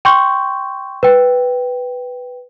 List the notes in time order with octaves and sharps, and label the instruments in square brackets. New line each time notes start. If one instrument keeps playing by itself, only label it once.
[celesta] G5 C6 C#6 G6
B4 G5